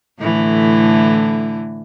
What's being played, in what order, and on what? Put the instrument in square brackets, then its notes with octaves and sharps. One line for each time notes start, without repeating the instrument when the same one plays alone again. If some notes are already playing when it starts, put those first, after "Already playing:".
[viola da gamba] A2 D3 E3